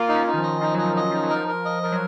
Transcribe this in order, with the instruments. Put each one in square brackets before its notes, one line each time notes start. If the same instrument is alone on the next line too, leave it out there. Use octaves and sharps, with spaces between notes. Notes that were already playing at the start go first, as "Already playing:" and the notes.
Already playing: [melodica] A#3 [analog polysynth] F4
[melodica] D#4
[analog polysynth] C#4
[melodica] D#4
[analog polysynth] D#3
F3
[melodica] D#5
[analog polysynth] F3 [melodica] D#4
[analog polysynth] F#3 [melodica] D#5
[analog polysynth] F3
[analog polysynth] F#3 [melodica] D#5
[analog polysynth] F3 [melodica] D#4
[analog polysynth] F#3
[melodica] A#4
[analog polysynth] F3
[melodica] A#4
D#5
[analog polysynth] F3 [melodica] A#4
[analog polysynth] F#3